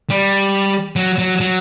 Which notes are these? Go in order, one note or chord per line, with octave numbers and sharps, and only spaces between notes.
G3
F#3
F#3
F#3